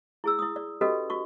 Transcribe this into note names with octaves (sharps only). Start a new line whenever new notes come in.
E4 G#4 E6
E4 D#6
D5
C#4 F#4 G4 A4 B4 D#5
F#4 C#6